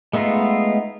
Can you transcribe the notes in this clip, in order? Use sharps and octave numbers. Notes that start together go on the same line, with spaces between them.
G#3 A3 B3 D#4 F4